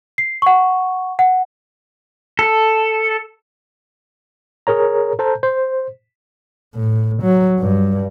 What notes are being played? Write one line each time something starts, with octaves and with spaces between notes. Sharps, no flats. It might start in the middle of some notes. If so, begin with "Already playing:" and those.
C7
F#5 C#6
F#5
A4
G#4 A#4 C#5 A#5
A4 C5 A5 A#5 G6
C5
A2
F#3
G2